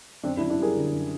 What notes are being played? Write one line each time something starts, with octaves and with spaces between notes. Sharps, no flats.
F#2 C4 D4
D4 E4
F#2
D4 E4
G3 G#4 A#4
D3
F#2